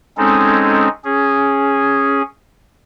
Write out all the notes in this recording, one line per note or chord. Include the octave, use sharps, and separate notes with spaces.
G#3 C4 C#4 D#4 A4
C#4 G#4